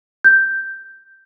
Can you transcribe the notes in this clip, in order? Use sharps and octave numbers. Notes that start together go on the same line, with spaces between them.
G6